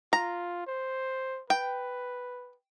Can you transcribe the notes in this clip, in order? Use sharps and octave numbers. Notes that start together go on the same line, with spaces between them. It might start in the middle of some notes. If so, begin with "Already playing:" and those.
F4 A#5
C5
B4 G5